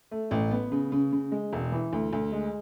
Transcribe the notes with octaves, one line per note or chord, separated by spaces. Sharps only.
A3
A1
B3
C#3
C#3
C#3
G#3
E1
E3
D2
D2
G#3